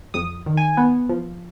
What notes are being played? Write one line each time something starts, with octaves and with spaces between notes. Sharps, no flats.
F2 D#6
D#3
G#5
B3
F3